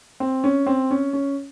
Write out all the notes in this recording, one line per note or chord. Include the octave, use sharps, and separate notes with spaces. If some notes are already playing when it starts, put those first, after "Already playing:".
C4
C#4
C4
C#4
C#4